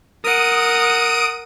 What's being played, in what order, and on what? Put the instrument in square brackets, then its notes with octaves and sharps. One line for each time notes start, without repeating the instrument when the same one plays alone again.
[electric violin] A#4 F#5 [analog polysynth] D#6 D7 D#7